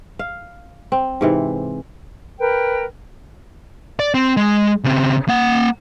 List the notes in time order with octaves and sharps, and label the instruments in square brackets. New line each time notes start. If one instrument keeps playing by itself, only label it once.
[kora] F5
C4
G#2 C3 E3
[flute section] A#4 B4 G5
[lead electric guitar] D5
C4
G#3
C#3 C4
A#3 F#5